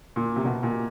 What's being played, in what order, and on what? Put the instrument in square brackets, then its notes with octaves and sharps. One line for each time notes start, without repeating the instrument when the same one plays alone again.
[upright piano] A#2
C3
B2
A#2